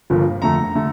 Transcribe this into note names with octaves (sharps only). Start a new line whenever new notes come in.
G1 G2 F3 A#3
F2 D3 A3 A#5
D3 A3